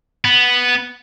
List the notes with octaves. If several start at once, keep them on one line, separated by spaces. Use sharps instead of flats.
B3